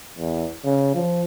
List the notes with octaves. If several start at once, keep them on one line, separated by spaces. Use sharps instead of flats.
E2
C#3
F3